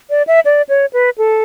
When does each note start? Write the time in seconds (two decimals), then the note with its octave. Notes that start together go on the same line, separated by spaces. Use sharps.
0.10 D5
0.27 E5
0.45 D5
0.69 C#5
0.93 B4
1.18 A4